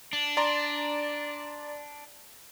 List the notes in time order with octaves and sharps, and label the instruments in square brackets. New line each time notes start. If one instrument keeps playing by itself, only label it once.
[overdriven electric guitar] D4
[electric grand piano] D5 A#5 C6